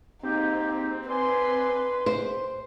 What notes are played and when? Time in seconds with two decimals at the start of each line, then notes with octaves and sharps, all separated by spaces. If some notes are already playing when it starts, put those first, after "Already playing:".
0.23 G#2 A#3 C4 D#4 G4
1.09 B4 D5 G#5 C6
2.06 C5